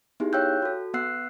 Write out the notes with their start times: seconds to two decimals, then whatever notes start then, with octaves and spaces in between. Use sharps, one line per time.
0.20 B3 D#4 E4 G4 G#4
0.33 C#5 F5 G5 E6 F#6 G6
0.62 F#4 A4
0.94 B3 F#5 E6 F#6 C7